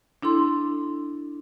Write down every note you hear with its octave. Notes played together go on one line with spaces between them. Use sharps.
D4 E4 A4 C6